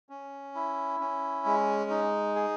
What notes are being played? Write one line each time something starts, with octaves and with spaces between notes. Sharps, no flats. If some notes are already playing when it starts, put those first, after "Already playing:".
C#4
E4
C#4
G#3
D#4
G#4